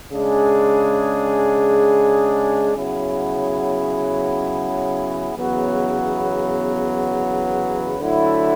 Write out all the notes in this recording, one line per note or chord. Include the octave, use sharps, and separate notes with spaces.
C#3 G#3 D4 G#4
C#3 F#3 B3 E4 G#4
E2 C#3 F#3 B3
D3 F#3 A3 E4